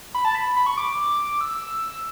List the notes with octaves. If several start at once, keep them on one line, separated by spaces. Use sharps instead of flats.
B5
A5
B5
B5
C#6
D6
E6